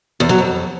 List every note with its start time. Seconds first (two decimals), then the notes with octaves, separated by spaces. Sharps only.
0.20 E2
0.29 F#3
0.38 F2